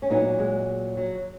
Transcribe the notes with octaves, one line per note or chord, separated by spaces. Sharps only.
C#4
A#2 F#3 B3 D#4
G#3
F#3